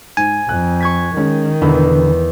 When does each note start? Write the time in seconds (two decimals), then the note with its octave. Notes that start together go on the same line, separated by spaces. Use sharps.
0.17 G#2 G#5
0.49 F2 F#6
0.80 C#6 G#6 B6
1.16 D#3 G#3 C#4
1.62 E1 E2 D3 B5